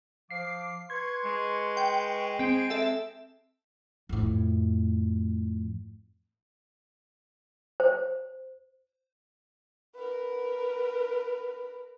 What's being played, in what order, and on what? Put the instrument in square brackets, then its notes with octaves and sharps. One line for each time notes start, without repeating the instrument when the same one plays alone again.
[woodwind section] F3 F5 D6 [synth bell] C7
[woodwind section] B4 C6 C#6 [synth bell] G#6
[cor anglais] G#3
[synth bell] G5
[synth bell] C4 D7 [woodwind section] G#4
[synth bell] A4 E5
[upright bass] F2 A2
[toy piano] C5
[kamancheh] A#4 B4